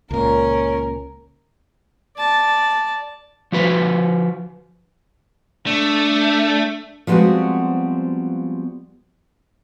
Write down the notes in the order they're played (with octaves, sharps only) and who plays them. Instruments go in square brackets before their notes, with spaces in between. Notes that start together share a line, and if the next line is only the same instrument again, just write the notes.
[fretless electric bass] C#2 A#2 [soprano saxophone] C#4 [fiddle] A#4
[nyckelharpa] D5 A5
[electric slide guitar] F3 F#4 B4 C5
[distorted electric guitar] A3 [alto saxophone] D4
[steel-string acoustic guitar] F3 G3 G#3 B3 C4 F#4